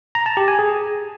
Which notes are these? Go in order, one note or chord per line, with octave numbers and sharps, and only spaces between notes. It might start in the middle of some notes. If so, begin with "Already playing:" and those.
A#5
A5
G4
G#5
G#4